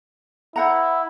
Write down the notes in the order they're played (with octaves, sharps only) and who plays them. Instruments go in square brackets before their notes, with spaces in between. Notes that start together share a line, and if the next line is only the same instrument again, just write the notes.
[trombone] E4 [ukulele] C5 F#5 A#5